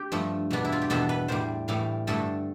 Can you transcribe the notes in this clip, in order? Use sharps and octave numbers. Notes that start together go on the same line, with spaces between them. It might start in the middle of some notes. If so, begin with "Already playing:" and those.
Already playing: D4 G4
G2 F3 A3
E2 B2 B3 D4
E4
F4
G4
E2 B2 B3 D4 A4
B4
A2 E3 G3 C5
A2 E3 G3 F5
G2 D3 A3 D4 A4